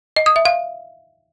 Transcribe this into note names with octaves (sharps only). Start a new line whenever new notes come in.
D#5
D#6
E5
F5